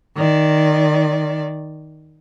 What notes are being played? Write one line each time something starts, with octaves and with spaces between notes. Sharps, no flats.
D#3 D5